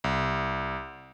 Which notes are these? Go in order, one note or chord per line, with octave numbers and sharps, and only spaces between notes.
C2